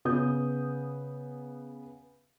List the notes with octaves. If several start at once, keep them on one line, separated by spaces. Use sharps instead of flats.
C#3 B3 D#6 G6